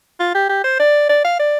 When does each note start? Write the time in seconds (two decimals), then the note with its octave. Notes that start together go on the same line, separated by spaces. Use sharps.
0.20 F4
0.35 G4
0.49 G4
0.64 C5
0.80 D5
1.09 D5
1.25 F5
1.39 D5